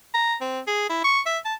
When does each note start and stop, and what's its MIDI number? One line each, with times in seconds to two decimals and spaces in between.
0.14 0.36 82
0.41 0.60 60
0.67 0.88 68
0.89 1.01 64
1.04 1.21 85
1.26 1.38 76
1.45 1.54 81